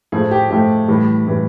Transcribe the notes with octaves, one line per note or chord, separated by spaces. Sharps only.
A2 F3 A3 G#4
G4
A2 F3 A3 G4
A2 E3 G3
A2 E3 G3